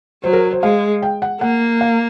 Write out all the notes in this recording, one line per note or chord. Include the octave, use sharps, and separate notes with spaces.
F#3 C5
A#4
C5
G#3 F5
G5
F#5
A#3 F#5
F5